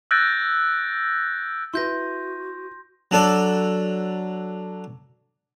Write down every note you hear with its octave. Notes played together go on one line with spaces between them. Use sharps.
E6 F#6 G6 A6 A#6 D7
E4 F#4 B4 C6 G6 A#6
F#3 D4 A4 D5